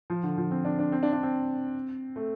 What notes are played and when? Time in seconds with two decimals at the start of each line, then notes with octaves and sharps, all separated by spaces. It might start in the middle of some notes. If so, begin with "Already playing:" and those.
0.10 F3
0.23 D3
0.38 F3
0.51 C4
0.65 D4
0.79 D4
0.92 C4
1.03 D4
1.13 D4
1.23 C4
2.16 A3